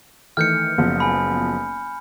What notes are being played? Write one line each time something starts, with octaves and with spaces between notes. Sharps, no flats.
D#3 E3 A3 F6 G6 C#7
F#1 F3 B3
G#5 B5